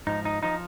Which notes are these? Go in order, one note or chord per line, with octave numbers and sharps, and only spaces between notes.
G#2 F3 D#4
D#4
F3 D#4